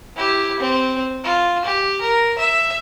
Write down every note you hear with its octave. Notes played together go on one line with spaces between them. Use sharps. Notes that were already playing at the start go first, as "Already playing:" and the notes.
E4 G4
C4
F4
G4
A#4
E5